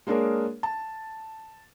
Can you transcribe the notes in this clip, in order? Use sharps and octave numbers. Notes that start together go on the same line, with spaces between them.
G#3 A#3 D4 G#4 A#4 C#5
A5